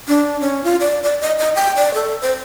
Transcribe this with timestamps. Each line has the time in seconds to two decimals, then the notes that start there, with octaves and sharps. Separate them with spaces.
0.08 D4
0.41 C#4
0.64 F4
0.80 D5
1.03 D5
1.21 D#5
1.38 D#5
1.55 G5
1.76 D5
1.94 A4
2.22 C5